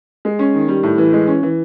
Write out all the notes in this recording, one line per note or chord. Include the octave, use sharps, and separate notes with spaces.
G#3
C#4
D#3
G3
A2
E3
G#3
C#4
E3